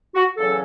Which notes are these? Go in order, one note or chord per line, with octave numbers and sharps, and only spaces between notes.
F#4
E2 C#3 F#3 C#4 A4